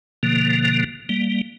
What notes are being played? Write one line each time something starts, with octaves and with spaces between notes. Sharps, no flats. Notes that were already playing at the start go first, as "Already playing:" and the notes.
B2 D3 F3 A#3
G3 A#3